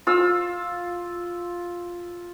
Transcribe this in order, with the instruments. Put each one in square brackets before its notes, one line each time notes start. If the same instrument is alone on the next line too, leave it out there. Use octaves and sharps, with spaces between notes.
[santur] F4 E6